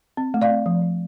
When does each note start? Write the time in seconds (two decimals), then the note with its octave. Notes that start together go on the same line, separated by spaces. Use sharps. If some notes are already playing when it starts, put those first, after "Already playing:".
0.17 C4
0.34 A3
0.42 D5 F5
0.51 C4
0.66 F3
0.82 F3